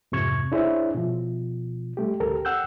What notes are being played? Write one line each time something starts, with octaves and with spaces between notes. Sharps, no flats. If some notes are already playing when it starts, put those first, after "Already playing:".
F2 G#2 C3 C#6 G#6
D4 E4 G#4 C5 C#5 E5
B2 F3
G3 A3 G4
D2 G4 A4 A#4
F#5 G5 E6 F#6 G6